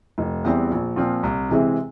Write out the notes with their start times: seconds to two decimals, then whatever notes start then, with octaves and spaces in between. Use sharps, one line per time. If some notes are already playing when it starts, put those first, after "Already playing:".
0.18 F1
0.44 E2 E3 G3 C4
0.71 A#1
0.96 A#2 F3 C4 F4
1.23 C2
1.49 C3 E3 G#3 C4